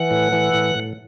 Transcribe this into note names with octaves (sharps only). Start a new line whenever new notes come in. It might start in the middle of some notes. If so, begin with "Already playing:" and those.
Already playing: E3 F#5
A2
E3
A2
A2